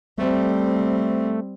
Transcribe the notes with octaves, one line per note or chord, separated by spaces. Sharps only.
G3 A3 C4